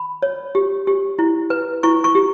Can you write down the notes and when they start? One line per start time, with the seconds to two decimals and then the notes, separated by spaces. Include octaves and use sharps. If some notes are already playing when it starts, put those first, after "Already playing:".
Already playing: B5
0.22 C#5
0.55 G4
0.87 G4
1.19 E4
1.50 B4
1.83 E4 C#6
2.04 C#6
2.15 G4